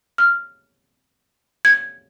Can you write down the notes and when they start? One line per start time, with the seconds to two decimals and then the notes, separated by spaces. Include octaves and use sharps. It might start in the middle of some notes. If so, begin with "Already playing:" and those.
0.18 F6
1.65 G#6